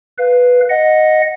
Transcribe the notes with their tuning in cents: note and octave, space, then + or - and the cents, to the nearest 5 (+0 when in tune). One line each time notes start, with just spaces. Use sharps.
B4 +0 F5 +0
D#5 +0 F#5 -10